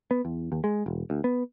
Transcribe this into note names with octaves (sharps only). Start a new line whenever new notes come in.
B3
E2
D#2
G#3
E1
D2
B3